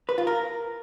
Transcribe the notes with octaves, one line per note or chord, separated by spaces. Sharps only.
B4
F4
A#4